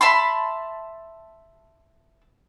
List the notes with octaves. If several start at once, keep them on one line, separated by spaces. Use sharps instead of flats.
E5 A5 B5 C6